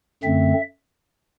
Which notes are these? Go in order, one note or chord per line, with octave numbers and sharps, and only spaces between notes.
F#2 D3 A3 C4 E5